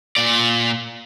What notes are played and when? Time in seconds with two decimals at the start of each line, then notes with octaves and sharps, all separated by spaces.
0.17 A#2 D5